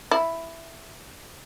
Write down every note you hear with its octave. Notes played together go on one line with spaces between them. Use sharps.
E4